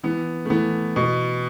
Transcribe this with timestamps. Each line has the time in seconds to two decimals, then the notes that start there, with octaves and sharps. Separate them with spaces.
0.04 E3 B3
0.45 A3
0.50 E3 B3
0.96 B2